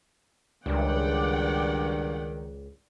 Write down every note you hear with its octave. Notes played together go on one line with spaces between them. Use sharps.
C#2 G2 D#3 D5 F#5 G5